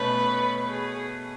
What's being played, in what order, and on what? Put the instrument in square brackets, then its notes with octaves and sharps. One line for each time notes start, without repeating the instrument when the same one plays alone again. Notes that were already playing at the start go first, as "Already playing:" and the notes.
Already playing: [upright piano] B2 A3 C#4 [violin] B4
[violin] G#4